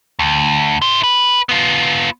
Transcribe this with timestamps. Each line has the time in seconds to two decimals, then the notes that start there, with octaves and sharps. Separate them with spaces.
0.19 D2
0.82 E4 C5
1.04 B4
1.49 B3 F4